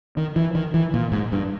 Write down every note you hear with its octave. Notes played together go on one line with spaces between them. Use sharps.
D#3
E3
D#3
E3
A#2
G#2
G2